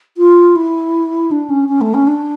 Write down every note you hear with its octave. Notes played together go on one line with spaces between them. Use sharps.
F4
E4
D4
C#4
C#4
A3
C#4
D4